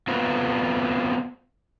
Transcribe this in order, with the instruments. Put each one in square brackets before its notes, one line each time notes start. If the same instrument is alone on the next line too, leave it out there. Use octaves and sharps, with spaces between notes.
[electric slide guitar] B3 C4 F4 F#4